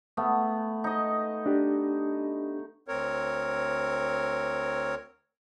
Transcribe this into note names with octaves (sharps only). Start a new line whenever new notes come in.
A3 B3
D#4 D#5
D4 G4
D2 C4 A#4 C#5